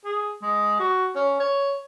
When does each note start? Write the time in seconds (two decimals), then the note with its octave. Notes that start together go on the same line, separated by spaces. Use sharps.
0.05 G#4
0.42 G#3
0.79 F#4
1.16 C#4
1.40 C#5